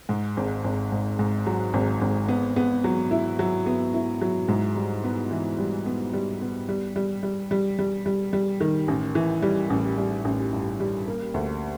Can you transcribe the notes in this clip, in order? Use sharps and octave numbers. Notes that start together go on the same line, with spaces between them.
G#2
G#1
G#1
G#2
G#2
F#3
G#1
G#1
B3
B3
F#3
E4
F#3
B3
E4
F#3
G#2
G3
B3
E3
G3
B3
G3
B3
G3
G3
G3
G3
G3
G3
G3
D#3
A1
E3
G3
A1
G3
A1
G2
G3
A#3
D2